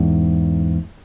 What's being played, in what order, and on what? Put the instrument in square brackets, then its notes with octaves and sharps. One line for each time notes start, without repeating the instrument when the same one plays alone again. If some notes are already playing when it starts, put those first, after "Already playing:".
Already playing: [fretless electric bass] E2 G#2